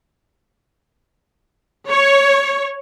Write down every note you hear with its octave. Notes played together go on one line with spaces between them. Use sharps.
C#5